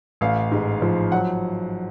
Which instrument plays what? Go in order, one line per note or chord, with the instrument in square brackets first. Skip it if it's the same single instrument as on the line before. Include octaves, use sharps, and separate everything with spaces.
[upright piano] A1 F5
G#2
F3
F#3 F#5